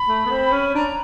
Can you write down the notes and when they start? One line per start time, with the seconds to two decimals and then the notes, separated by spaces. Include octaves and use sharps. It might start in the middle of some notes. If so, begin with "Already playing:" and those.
Already playing: B5
0.08 A3
0.26 B3
0.31 C4
0.52 C#4
0.75 D4 A#5